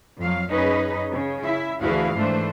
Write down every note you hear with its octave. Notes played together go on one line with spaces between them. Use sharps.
F2 F#3 F5
F#2 C#4 D#4 G#4 B4 D#5
C#3
E4 E5
D2 E3 E4 F#4 G#4 F5
G#2 E3 A3 D4 C5